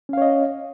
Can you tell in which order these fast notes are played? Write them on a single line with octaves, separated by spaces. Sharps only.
C#4 F5 C#5 D#5